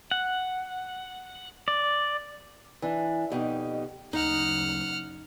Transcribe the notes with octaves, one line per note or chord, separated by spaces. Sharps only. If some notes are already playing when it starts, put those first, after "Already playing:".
F#5
D5
E3 D4
F2 B2 D#4 G4
F#1 D2 D#4 F#5 F6